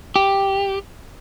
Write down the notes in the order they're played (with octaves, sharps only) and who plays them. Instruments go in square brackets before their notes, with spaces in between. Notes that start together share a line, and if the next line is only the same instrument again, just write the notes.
[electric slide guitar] G4